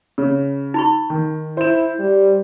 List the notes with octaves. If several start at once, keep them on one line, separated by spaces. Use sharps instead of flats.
C#3
D#4 B5 C#6
D#3
E4 C5 E7
G3